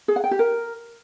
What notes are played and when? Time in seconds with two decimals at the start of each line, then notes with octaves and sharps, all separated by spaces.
0.08 G#4
0.16 F#5
0.24 G5
0.31 G4
0.39 A#4